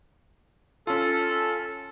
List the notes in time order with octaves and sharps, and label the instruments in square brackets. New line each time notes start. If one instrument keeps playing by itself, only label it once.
[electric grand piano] C#4 F4 [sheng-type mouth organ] A4